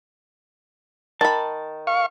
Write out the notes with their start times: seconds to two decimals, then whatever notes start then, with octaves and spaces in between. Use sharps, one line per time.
1.21 D#3 A5 B5
1.87 F5 C#6